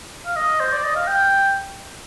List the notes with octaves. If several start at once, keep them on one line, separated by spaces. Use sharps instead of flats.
F5
D#5
C5
D5
D#5
F5
G5